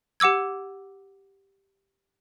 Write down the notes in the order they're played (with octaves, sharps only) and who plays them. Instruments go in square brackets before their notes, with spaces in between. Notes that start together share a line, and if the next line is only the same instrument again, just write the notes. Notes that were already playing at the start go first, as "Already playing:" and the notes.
[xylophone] G4 F#5 D6 E6 G#6